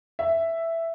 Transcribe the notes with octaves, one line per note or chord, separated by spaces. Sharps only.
E5